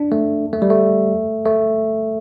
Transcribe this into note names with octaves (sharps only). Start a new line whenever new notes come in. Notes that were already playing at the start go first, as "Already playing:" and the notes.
Already playing: D4
A3
A3
G3
A3
A3